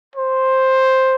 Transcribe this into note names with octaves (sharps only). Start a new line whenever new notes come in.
C5